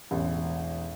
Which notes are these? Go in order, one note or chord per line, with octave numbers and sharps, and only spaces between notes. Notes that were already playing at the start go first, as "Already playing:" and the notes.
E1 A1